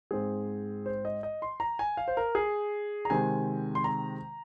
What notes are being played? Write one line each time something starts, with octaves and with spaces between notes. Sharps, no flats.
G#2 G#3 C4 G#4
C5
D#5
D#5
C6
A#5
G#5
F5
C5
A#4
G#4
A#5
C3 D#3 G#3 C4 G#5
C6
A#5